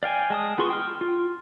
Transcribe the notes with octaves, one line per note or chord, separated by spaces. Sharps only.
D5 F5 G5 G#5
G#3 A5 D#6
B3 F4 G#4 C6 C#6
G5 F6
F4